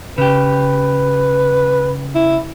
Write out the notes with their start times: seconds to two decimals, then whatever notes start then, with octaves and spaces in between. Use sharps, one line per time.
0.18 C#3 G4 B4
2.15 E4